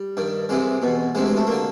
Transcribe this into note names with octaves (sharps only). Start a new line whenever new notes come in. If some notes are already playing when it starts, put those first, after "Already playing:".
Already playing: G3
G2 D#3
C2 C3 E3 G#3
E2 B2
D2 C3 E3 G#3
G#3
A3
D3 A#3